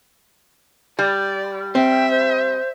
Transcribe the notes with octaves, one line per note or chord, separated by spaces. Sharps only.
G3 D5
C4 E5 G5
C5